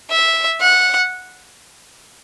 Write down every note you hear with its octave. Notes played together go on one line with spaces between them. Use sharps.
E5
F#5